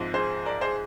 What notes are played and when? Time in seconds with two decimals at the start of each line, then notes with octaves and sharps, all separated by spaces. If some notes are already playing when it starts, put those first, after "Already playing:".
Already playing: A#1 G#2 F3 C4
0.14 G#4 C5
0.45 A#4 D5
0.61 G#4 C5